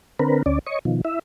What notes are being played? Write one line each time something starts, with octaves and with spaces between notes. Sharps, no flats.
D3 C4 A#4 B4
D2 C#4 D5
C#5 D#5 C#6
B2 D#3 F3
E4 E5